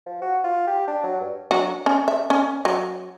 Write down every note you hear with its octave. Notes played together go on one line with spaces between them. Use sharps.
F3
F#4
F4
G4
D4
F#3
G2
F#3 D4 F#4
C#4
E5
C#4
F#3